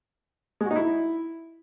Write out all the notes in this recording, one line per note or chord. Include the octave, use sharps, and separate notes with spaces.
G#3
F#4
D#4
E4